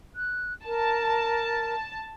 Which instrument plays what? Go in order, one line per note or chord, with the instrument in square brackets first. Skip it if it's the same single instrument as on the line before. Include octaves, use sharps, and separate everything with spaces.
[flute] F#6
[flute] A#4 [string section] A5